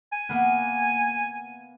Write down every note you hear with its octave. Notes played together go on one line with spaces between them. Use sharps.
G#5
A#3 B3